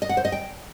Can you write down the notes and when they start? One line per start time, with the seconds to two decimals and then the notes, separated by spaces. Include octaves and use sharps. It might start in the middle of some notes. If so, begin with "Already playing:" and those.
0.02 D#5
0.09 F#5
0.17 C5
0.25 D#5
0.32 G5